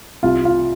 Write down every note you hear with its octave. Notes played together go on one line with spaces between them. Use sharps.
C2 F4
F4